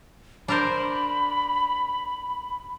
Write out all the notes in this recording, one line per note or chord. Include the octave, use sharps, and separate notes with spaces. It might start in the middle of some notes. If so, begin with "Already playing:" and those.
D4 A#4 C5 B5